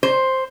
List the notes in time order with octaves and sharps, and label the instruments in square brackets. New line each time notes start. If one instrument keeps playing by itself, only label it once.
[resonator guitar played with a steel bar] C5